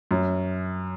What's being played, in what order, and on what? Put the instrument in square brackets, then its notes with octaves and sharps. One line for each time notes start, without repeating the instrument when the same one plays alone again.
[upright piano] F#2